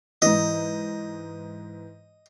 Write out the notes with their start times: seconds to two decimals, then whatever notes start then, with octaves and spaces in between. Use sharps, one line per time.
0.22 G#2 E3 D#5